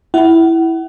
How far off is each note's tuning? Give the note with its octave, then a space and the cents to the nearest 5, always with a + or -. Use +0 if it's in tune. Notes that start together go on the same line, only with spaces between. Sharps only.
E4 +0 F#5 +30